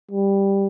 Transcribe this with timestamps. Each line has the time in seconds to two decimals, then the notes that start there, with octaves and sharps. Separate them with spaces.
0.11 G3